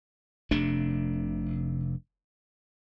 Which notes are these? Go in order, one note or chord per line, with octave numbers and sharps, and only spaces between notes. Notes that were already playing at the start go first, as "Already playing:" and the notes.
F1 C3 A3 D4